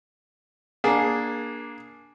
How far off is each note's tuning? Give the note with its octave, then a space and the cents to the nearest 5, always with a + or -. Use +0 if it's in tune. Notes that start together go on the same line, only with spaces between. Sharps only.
A#3 +15 D4 -5 G#4 +0